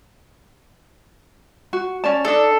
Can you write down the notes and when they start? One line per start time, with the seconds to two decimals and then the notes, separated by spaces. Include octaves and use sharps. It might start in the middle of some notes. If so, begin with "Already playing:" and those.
1.73 F#4
2.04 C#4 D5 A5
2.25 D4 D#4 A4 D5